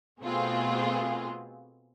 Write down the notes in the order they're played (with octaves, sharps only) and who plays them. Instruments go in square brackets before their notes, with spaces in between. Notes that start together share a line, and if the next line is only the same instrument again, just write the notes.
[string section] B2 A3 B3 C4 F4 G#4